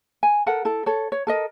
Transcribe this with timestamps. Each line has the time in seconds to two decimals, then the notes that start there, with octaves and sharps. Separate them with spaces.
0.23 G#5
0.46 A4 A#4 F#5
0.65 E4 A4
0.86 A4 C#5
1.12 C#5
1.27 A4 A#4 D#5